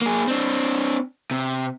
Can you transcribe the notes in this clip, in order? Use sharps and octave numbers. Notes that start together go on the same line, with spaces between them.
A#3 G#4
C4 D4
C3